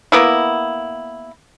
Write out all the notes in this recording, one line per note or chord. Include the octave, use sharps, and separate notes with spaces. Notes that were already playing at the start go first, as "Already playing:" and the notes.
A#3 B3 E4